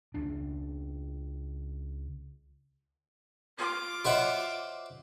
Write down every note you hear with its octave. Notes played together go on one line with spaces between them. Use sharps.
C#2 C#3 D4
F4 D6
F#4 C5 C#5 D#5 E5 F#5